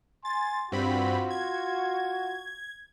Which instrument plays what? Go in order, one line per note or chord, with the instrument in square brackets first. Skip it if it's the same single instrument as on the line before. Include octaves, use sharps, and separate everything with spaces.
[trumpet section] G#5 C6 [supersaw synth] A6
[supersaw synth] G2 C4 B5 [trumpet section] F4 F#4
[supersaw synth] G#6